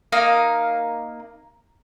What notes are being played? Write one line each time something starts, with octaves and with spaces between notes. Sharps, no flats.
A#3 D#4 F5